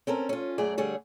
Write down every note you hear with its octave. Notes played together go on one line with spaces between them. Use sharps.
C4 C#4 A4 A#4
C#4 F4
F#2 A3 G#4 D5
D3 G3 G#4 C#5